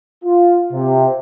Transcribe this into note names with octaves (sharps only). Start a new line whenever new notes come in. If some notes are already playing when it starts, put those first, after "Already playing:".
F4
C3